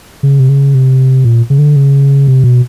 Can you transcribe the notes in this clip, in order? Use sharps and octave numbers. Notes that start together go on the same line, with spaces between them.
C#3
C3
C#3
C3
A#2
C#3
D3
C#3
C3
B2